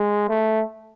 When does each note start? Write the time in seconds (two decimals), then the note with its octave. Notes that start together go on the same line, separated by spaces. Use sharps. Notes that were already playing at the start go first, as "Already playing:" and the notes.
Already playing: G#3
0.28 A3